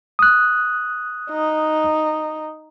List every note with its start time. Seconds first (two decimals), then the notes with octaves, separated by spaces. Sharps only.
0.19 D#6 F#6
1.31 D#4